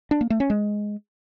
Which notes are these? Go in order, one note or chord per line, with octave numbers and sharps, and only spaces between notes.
D4
A#3
A3
C#4
G#3